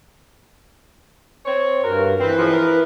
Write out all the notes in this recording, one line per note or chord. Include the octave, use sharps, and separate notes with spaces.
C4 C#5
G2 F#4 A#4
E3 C4 B4
G#2 C#3 F3
A#4